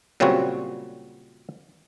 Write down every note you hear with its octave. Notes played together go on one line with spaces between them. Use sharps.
A#2 C#3 F#3 G3 C4 F#4